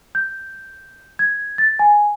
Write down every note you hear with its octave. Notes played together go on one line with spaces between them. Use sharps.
G6
G#6
A6
G#5